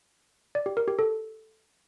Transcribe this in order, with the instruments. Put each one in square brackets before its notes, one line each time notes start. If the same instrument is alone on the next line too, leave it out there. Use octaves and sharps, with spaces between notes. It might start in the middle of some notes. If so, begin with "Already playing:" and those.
[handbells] D5
G4
A#4
G4
A4